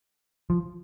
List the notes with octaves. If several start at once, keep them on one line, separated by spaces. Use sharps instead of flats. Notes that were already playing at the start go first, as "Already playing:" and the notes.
F3